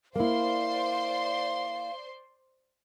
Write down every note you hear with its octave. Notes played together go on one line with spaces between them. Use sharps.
A#3 E4 C5 D5 F5 C6